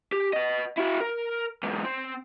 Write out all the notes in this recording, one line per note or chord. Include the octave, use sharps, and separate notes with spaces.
G4
B4 D#5
E4 F#4
A#4
E2 G#2
C4